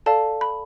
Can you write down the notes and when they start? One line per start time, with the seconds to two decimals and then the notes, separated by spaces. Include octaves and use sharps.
0.06 A4 D5 F5 A5
0.41 B5